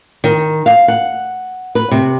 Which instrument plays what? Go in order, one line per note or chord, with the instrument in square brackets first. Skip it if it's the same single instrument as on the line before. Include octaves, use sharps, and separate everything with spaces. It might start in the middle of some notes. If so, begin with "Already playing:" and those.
[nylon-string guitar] D#3
F5
F#5
B4
C3